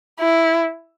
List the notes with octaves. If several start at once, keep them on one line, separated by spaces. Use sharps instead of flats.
E4